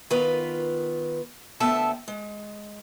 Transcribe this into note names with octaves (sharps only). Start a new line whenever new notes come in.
D#3 B3 F4 A#4 B4
D2 B3 A4 E5 G5 A5
G#3